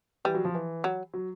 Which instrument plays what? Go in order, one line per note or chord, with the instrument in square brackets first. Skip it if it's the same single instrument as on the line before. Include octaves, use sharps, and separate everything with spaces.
[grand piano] E3 [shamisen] G3
[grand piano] F#3
F3
E3
[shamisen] F#3
[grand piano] F#3